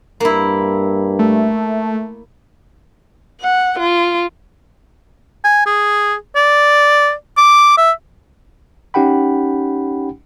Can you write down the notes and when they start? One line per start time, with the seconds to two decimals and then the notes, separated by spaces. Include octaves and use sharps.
0.20 G2 A#3 E4
1.19 A3
3.41 F#5
3.79 F4
5.44 G#5
5.66 G#4
6.36 D5
7.37 D6
7.78 E5
8.94 C#4 D#4 G4 F#5 G5 B5